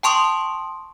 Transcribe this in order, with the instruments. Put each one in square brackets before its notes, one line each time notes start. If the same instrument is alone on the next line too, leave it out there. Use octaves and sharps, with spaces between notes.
[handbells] G5 A5 C6 C#6 D#6